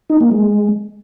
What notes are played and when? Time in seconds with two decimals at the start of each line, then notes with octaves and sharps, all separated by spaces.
0.10 D#4
0.20 A#3
0.31 G#3